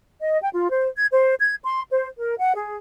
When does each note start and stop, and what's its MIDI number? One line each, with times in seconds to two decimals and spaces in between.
0.20 0.38 75
0.41 0.49 79
0.53 0.71 65
0.71 0.87 72
0.97 1.06 92
1.12 1.35 72
1.40 1.56 92
1.65 1.82 84
1.91 2.07 72
2.18 2.35 70
2.38 2.55 78
2.55 2.75 68